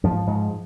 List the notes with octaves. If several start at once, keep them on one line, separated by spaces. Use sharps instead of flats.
G#2 F3
G#2